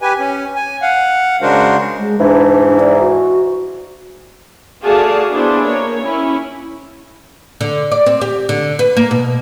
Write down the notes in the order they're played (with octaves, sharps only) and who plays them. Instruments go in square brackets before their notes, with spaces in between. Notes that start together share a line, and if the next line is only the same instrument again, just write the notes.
[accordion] G4 B4 G#5
C#4
G#5
F5 F#5
C#3 G#3 D4 F#4 A#4 C5
[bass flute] G#3
[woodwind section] G#2 E3 [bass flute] D4
[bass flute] D5
F#4
[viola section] A3 F#4 G#4 D5 F5 A5
B3 D4 E4 G#4 C5
A#3 C#5
C#4 E4
[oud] D3
D5
C4
G4
D3
B4
A#3
B2